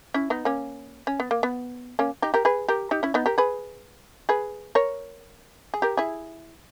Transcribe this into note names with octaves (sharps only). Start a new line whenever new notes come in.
C#4 E4
B3 D#4
A#3 C#4
C#4
B3
A#3
B3
A#3 C#4
D#4 G4
G4 A#4
G#4 B4
G4 A#4
D#4 G4
C#4 E4
B3 D#4
G4 A#4
G#4 B4
G#4 B4
A#4 C#5
G#4
G4 A#4
E4 G#4